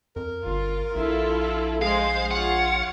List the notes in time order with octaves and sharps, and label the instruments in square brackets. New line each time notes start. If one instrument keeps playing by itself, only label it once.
[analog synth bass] F2 [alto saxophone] A#4
[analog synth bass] G1 [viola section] F4
[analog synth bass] A#1 [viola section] E4 F4 A4
[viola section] G#3 C5 [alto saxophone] G#4 [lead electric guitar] F5
[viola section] F4 C#5 F5 [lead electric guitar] F#5